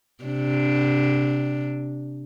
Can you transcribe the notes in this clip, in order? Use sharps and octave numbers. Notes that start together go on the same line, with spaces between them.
C3 D4